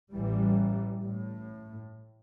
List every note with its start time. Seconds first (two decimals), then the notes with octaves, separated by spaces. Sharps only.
0.13 A1 E3 G3
1.03 A2